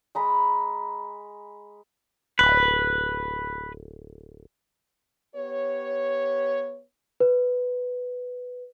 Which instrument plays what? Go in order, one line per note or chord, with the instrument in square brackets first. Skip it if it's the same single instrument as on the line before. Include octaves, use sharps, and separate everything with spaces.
[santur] G#3 A#5 B5
[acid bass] D1 [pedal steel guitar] B4
[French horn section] B3 G4 B4 C#5
[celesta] B4